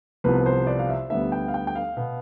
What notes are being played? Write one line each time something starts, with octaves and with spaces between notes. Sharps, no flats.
C2 C3 F3 B3 B4
C5
D5
F5
E5
D2 D3 G3 B3 E5
G5
F5
G5
G5
F5
B2 B3